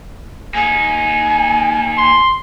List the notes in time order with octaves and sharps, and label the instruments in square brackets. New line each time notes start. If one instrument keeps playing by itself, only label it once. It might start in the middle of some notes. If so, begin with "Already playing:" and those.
[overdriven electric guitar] A#3 D#4 [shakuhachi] G#5
[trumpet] C6